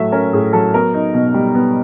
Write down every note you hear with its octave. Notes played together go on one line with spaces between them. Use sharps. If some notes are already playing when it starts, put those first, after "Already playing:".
Already playing: A2 F#3 A3 E5
C#4 A#4
A2 G#4
F#3 A4
B3 A#4
D#4
B2
G3
B3